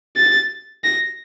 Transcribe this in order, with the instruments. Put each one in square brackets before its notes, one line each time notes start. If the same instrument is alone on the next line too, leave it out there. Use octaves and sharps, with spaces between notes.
[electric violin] A6
A#6